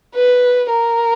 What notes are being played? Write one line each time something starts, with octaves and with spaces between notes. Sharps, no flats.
B4
A#4